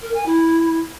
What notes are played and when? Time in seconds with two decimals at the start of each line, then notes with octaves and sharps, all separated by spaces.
0.02 A#4
0.14 G#5
0.26 E4